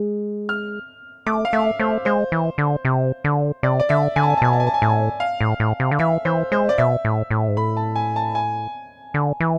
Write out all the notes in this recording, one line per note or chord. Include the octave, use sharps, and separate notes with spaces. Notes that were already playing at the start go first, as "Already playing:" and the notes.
Already playing: G#3
F6
A3 D6
F5
A3 E5
A3 C5
G#3 C5
E3
D3
C3
D3
C3 D5
D5
D3 E5
D3 G#5
A5
G#5
A5
B2 G#5
A5
G#5
A5
G#5
A2 A5
G#5
F5
A2
A2
C3
D3
E3 E5
E3 C5
G#3 C5
D5
B2 E5
A2
A2
G#2
A2 B5
A5
G#5
A5
G#5
D3
E3